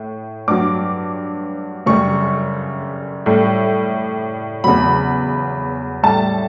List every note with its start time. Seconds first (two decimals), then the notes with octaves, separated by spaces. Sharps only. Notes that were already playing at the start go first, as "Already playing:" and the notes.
Already playing: A2
0.48 G2 F#3 D6
1.86 F#2 C#3 G3 C#6
3.26 A2 G3
4.64 E2 C#3 F#3 B5
6.03 A2 G3 A5